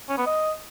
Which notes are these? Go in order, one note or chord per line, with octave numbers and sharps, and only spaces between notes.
C#4
B3
D#5